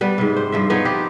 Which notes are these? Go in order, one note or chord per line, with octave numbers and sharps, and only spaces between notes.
G3 B3 B4
G#2 C3
C5
G2 F3 E5
F3 B3 D#4 C#5
C4 G4 B4